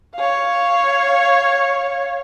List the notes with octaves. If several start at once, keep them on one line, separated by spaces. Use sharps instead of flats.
C#5 F5